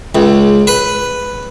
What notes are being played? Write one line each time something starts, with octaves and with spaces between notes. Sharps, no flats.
C#2
B4